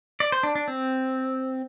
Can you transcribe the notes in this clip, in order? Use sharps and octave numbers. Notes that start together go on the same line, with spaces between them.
D5
C5
D4
D4
C4